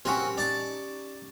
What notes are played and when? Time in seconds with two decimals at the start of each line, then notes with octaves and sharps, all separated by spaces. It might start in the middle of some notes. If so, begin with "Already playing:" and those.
0.05 C4 C#4 F#4 G4 A#4 E5 C#6
0.37 D#4 D5 A5